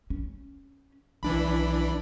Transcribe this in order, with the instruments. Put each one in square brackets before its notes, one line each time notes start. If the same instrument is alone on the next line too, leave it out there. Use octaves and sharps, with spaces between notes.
[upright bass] C#4
[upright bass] B1 [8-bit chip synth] E3 D4 B5